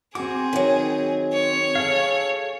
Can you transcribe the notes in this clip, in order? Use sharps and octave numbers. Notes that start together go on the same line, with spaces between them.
C4 F#4 G#4 D6
D#3 F#3
C#5
G#4 A4 F5